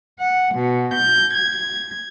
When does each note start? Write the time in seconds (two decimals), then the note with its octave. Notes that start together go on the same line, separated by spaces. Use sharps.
0.18 F#5
0.54 B2
0.95 G6
1.34 G#6